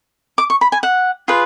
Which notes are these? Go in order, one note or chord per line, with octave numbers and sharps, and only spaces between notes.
D6
C#6
B5
G#5
F#5
F4 G#4 B4